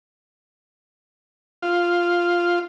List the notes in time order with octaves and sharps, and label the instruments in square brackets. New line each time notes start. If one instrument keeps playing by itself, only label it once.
[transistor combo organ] F4